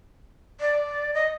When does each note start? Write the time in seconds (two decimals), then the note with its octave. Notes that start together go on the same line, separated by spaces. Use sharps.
0.60 D5
1.14 D#5